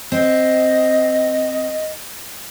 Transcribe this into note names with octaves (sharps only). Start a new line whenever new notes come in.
C4 D#5